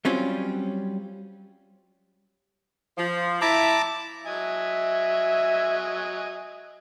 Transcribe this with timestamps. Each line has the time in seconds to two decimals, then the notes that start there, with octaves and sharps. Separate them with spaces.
0.05 F#3 G3 C4 C#4 F4
2.96 F3
3.41 E4 A5 A#5 D6
4.27 F#3 D#5 E5 G#5